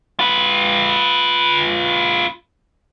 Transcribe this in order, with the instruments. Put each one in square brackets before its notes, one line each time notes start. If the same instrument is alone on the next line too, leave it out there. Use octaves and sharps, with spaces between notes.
[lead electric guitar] F4 B4